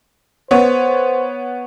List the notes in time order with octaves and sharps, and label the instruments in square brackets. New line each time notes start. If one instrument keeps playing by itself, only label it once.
[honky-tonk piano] B3 C#5 [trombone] C5